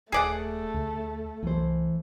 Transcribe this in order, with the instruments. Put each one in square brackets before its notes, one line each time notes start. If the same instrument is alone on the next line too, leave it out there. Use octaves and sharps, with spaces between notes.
[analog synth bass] D#1 [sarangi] A3 [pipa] G#4 D5 F#5
[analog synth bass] D2
[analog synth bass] C2 [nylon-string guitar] E3 C5